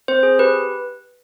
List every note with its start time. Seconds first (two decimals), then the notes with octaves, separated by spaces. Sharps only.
0.08 C4 C5
0.23 G#4
0.39 G4 B4